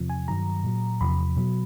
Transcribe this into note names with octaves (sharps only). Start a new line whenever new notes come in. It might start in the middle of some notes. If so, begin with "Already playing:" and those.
Already playing: E2 C3 F3
G#5
G2 D#3 F#3 A#5
A#2 F#3
E2 C3 F3 B5
B2 F#3